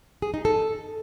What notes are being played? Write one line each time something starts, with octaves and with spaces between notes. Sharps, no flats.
G#4
D#4
A4